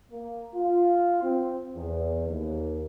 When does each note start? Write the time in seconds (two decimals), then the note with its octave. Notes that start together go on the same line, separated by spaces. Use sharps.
0.10 A#3
0.53 F4
1.22 C4
1.76 E2
2.26 D#2